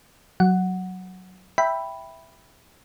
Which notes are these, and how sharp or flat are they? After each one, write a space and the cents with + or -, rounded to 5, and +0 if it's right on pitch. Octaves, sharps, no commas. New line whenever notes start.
F#3 +0 F#5 +0
E5 +0 G5 +0 B5 +0